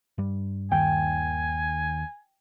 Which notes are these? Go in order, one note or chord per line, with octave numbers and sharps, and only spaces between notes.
G2 G3
D#2 D#3 G5 G#5